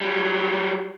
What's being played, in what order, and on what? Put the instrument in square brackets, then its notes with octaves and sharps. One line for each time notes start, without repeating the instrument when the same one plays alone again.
[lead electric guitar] F#3 G3